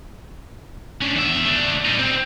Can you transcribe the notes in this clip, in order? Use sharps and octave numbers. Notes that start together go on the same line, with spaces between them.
C#4 D4
E2 E5
A3 D4
G3 D#4
C4